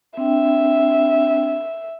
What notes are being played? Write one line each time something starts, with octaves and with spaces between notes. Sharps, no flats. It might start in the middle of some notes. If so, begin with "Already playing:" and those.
C4 D4 E5 G5